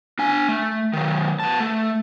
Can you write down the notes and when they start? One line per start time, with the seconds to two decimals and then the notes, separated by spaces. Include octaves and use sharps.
0.19 D4 G#5
0.48 A3
0.93 D#3 F#3
1.40 B3 A5
1.60 A3